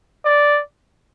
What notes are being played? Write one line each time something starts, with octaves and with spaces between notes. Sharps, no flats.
D5